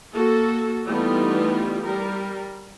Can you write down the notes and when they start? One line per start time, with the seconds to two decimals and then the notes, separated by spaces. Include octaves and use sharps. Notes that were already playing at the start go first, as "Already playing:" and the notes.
0.14 A#3 F#4 A4
0.87 E3 G3 A3 B3 D#4 F4
1.85 G3 A#4